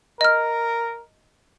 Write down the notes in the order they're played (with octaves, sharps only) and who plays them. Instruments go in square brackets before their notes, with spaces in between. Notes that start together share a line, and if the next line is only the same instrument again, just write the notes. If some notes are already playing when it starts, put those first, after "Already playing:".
[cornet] A#4 [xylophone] D#5 F6